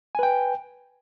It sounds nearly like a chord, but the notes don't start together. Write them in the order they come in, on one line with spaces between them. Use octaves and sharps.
G#5 B4 G5